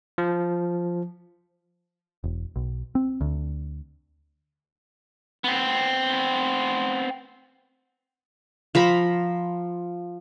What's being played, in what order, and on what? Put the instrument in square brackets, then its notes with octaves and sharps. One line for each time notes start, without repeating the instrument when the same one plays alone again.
[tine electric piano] F3
[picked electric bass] E1
B1
C4
D2
[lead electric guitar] B3 C4
[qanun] F3 A#5 B5